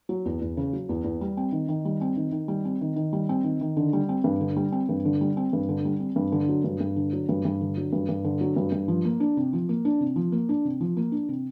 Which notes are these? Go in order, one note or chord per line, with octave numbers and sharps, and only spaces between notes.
F#3
E2
E2
C#3
F#3
E2
E2
G3
C4
D#3
D#3
G3
C4
D#3
D#3
G3
C4
D#3
D#3
G3
C4
D#3
D#3
D3
G3
C4
G2
D3
G3
C4
G2
D3
G3
C4
G2
D3
G3
C4
G2
D3
F#3
G2
G2
D3
F#3
G2
G2
D3
F#3
G2
G2
D3
F#3
G2
G2
F3
A#3
D4
C3
F3
A#3
D4
C3
F3
A#3
D4
C3
F3
A#3
D4
C3